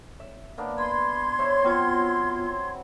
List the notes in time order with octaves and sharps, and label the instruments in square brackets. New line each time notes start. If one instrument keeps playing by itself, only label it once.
[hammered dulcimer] E5
A#3 B3 D4
[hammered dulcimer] B4 [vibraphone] B5 [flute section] C6 G#6
[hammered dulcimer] E4 C5 C#5
[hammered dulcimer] F#3 C4 [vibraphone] B3 F4 C#5